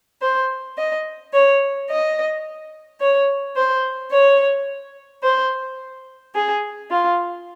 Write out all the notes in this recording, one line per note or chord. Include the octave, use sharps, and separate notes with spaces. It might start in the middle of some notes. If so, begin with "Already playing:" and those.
C5
D#5
C#5
D#5
C#5
C5
C#5
C5
G#4
F4